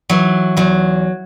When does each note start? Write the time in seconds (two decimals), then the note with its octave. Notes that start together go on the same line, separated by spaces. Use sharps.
0.10 E3 F#3
0.57 E2 F#3